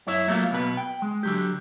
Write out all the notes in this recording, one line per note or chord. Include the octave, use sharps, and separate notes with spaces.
F#2 E4 C#5 E5
F#3 G3 A3 A#3 F4 F5
B1 B2 B3 B4
G5
G#3
D3 F#3 G4